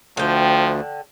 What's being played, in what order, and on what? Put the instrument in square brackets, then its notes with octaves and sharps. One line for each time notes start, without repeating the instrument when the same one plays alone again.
[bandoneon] D2 [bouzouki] D3 G5 [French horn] F3